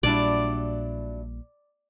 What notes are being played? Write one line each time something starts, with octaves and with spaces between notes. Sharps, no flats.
A#1 A#2 F#3 G3 D4 E4 D5